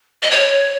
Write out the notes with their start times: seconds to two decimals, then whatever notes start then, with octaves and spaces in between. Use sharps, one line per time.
0.23 D#5
0.31 C#5